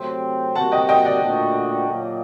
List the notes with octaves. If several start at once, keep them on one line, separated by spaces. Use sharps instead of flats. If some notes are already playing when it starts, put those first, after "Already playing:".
Already playing: C3 F#3 A3 C4
C3 G3 A#3 F#4 F#5 A5
D#5 G5
D#5 G5
D5 F#5
A#2 A3 D4 F#4
A#2 F#3 A#3